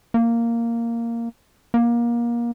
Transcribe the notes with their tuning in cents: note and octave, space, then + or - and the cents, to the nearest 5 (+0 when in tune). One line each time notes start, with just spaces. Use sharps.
A#3 -5
A#3 +25